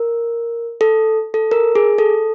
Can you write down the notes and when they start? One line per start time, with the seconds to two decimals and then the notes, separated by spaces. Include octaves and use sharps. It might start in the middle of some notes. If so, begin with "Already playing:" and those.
Already playing: A#4
0.81 A4
1.34 A4
1.51 A#4
1.75 G#4
1.98 A4